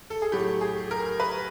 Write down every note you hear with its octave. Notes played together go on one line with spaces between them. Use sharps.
A4
G#4
A2 F#3 A3 G4
G#4
A#4
B4